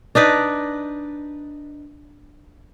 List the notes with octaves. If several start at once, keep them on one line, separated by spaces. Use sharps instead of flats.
D4 D#4 B4 D5